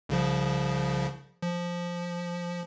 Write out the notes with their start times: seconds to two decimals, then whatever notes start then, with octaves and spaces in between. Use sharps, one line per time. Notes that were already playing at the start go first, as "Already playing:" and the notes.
0.09 C2 C#3 F3
1.42 F3